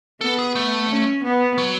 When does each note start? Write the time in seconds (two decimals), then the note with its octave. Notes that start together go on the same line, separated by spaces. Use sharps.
0.21 B3 A4
0.39 G#4
0.55 A3
0.89 C#4
1.24 B3
1.58 F#3